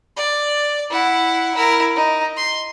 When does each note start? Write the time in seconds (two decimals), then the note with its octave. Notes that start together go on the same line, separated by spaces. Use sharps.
0.17 D5
0.90 E4 F#5
1.55 E4 A#4
1.96 D#4
2.37 C6